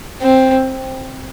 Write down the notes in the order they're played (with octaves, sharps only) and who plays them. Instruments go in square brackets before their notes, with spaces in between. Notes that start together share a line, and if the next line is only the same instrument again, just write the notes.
[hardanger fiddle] C4